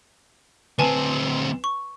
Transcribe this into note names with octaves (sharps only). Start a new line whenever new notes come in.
D2 C4 B4 G#5 A5
C#6